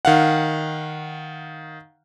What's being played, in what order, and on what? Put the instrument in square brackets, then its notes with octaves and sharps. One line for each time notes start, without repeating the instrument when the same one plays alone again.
[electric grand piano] D#3 F5 F#5